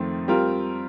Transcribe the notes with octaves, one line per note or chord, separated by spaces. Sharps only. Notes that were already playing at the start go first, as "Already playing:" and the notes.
Already playing: F2 D#3 A3 C4
G3 C4 F4 A#4